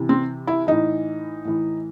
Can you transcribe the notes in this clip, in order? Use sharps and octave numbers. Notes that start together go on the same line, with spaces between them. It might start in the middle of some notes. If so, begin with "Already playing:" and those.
Already playing: C3 E3
C4
E4
A2 E3 D#4
A2 E3